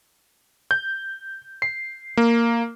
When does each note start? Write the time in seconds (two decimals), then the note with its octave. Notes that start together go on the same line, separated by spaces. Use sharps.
0.71 G6
1.62 C7
2.17 A#3